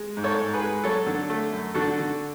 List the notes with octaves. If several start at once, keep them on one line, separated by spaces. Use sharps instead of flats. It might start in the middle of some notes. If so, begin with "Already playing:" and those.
Already playing: G#3
G#2
A4 C#5
G#2
G#4 B4
G#3
F#3 A4 C#5
D3
A3
F#2
D3 F#4 A4
D3